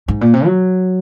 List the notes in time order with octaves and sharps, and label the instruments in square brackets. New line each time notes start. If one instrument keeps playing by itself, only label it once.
[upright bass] G#2
A#2
C3
F#3